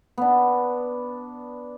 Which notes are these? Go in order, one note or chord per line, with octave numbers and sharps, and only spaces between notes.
B3 D4